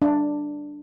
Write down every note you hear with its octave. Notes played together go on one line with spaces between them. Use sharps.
D4